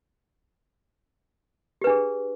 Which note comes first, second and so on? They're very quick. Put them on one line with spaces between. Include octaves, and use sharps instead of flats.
G4 B4 D4 G#4